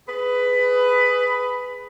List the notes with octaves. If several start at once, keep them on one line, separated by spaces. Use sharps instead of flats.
G#4 B4